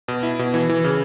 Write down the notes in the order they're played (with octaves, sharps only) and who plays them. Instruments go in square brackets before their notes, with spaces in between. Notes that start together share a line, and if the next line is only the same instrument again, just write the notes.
[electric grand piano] B2
E4
B2
E3
E3
C#3